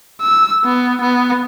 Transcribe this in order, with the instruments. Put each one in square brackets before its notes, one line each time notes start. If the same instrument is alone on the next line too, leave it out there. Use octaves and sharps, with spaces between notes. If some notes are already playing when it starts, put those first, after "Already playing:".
[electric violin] E6
B3
B3